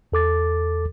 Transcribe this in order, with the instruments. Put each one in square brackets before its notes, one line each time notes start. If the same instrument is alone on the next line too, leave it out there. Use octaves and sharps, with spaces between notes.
[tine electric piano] E2 A4 D6 A6